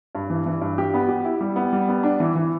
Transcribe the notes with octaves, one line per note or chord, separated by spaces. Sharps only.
G2
E3
E3
G2
G4
B3
G4
E4
G3
B3
G3
B3
D4
E3
E3